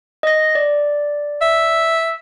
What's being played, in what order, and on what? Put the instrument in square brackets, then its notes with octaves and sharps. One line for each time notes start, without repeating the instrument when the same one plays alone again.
[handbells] D#5 A#6
D5
[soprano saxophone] E5